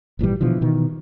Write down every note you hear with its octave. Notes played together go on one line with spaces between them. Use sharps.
G#1 A#2 E3 G3
B2 D3 E3 F3
B2 D#3 E3